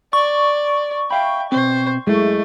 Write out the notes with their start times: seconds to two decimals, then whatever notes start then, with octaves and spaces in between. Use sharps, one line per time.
0.13 D5 C#6
1.11 E5 F5 G5 B5
1.52 B2 C4 C5
2.07 F#2 G#3 A3 E4